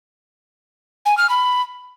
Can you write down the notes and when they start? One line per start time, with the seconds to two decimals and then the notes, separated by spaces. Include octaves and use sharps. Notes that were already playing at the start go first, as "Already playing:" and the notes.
1.05 G#5
1.17 F6
1.29 B5